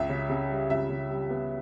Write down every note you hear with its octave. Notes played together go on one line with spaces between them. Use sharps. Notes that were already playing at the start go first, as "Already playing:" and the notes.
Already playing: C#2 E5
C#3
C#3
G3
C#2 E5
C#3
G3
B3